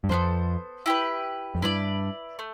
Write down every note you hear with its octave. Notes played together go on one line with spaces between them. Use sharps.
G2
F2 B3 D4 A4 C5
E4 G4 B4
F2
G2 E4 B4 D5
A3